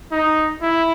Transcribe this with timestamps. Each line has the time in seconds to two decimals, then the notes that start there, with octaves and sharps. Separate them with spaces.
0.12 D#4
0.62 E4